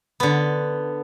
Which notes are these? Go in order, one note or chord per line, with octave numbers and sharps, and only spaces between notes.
D3 B3